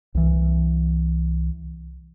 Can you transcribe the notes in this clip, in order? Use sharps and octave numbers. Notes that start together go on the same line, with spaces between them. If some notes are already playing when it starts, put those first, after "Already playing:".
C2 E3